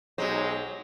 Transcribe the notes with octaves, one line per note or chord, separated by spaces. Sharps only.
B1 F#3 G#3 D#4 G4 C5